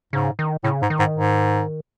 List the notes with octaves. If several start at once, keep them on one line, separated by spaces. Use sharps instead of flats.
G#2 C#3
D#3
A2 C#3
G#2
D#3
G#2
G#2